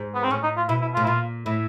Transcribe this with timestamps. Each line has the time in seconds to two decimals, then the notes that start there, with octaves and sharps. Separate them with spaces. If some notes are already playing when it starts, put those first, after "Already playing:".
Already playing: G#2
0.15 B3
0.24 C4
0.31 A2 C#4
0.43 D#4
0.57 F4
0.69 B2 E4
0.81 E4
0.94 F4
0.97 A2
1.04 E4
1.07 A#2 F4
1.46 A2 E4